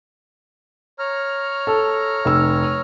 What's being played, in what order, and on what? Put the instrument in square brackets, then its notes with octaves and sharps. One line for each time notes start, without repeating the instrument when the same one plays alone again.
[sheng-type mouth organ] C#5 A#5 F6
[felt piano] A4
F1 E6